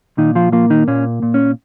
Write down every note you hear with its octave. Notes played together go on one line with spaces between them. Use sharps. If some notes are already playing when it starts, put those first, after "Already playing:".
A#2 D#3 D#4
F3 F4
F3 A#3 F4
D#3 D#4
A#2 C#4
A#2
C#4